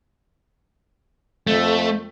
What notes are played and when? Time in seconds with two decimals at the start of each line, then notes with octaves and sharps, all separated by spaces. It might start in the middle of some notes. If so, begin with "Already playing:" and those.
1.47 F2 A3